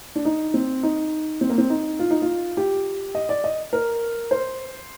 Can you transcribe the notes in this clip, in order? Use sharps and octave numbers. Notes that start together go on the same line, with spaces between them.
D4
D#4
C4
D#4
C4
A#3
C4
D#4
F4
D#4
F4
G4
D#5
D5
D#5
A#4
C5